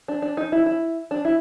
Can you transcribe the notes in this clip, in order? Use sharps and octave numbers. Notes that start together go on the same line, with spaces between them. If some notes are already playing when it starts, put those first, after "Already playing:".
D4
D4
D#4
E4
E4
D4
E4